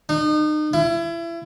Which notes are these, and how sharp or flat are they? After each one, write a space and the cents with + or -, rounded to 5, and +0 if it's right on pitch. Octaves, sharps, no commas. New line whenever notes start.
D#4 -35
E4 +30